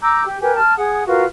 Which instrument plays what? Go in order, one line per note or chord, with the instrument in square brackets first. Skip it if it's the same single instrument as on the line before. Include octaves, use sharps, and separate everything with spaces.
[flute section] A#5 D6 E6 G6
G4
G4 A#4 B4 G#5
A5 F6
G#4 F#5 D#6
F4 F#4 A#4 B4